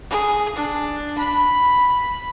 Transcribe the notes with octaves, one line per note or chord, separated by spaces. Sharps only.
G#4
D4
B5